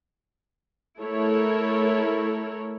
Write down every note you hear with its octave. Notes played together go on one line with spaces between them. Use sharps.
A3 E4 A4 A#4 C#5